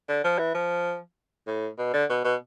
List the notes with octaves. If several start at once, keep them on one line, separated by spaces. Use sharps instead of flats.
D3
F3
E3
F3
A2
B2
D3
B2
B2